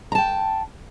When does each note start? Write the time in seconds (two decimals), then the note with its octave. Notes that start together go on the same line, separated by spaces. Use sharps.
0.12 A#5
0.15 A5
0.18 G5